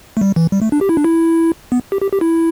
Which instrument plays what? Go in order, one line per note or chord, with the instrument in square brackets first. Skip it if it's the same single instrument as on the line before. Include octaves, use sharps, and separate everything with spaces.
[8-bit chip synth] A3
G3
E3
G3
A3
D4
G4
E4
D4
E4
B3
G4
G4
G4
E4